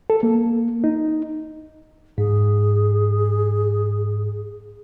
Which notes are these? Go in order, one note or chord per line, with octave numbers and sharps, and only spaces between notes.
A4
A#3
D#4
G#2 G#4